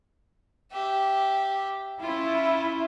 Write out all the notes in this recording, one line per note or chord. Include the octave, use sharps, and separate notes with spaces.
G4 E5
C#4 E4 F4